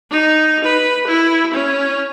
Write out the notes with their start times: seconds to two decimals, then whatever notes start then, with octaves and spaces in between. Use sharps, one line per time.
0.11 D#4
0.64 B4
1.07 E4
1.53 C#4